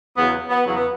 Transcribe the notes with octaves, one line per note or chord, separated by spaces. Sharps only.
E2 C#3 F#3 B3
B3
E2 C#3 F#3
B3